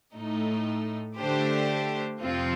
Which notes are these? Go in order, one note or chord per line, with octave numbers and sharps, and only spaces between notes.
A2 A3 D#4
D3 A3 D4 G4 C5
F2 C3 F3 C4 F4